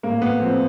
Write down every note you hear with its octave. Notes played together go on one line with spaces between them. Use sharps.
A2 A#3
B3
F3 C4